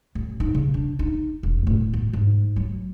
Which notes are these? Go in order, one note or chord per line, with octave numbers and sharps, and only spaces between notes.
A1
D#4
C#3
D4
D#4
E1
A2
B3
G#2
F#3